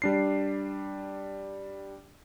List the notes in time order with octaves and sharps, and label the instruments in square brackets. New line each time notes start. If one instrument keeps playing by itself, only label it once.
[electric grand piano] G3 D4 C7